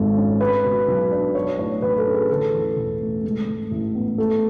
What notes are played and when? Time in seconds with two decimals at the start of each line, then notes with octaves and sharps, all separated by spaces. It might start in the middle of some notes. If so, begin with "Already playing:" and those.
Already playing: G#1 G#2 G#3 A4
0.17 C#4
0.40 G#3 B4
0.64 B2
0.88 B1
1.12 D4
1.35 F#3 C#5
1.58 A2 C#5
1.82 A1 B4
1.98 A4
2.06 C#4
2.14 G#4
2.29 D3 A4
2.54 E2
2.76 E1
3.00 A3
3.24 G#3
3.47 G#2
3.71 A1
3.95 B3
4.18 A3 A4